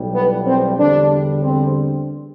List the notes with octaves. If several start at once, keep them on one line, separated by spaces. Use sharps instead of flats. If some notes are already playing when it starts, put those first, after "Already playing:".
Already playing: B1 A2 G3
B3
C4
E2 D3 G3 D4
C4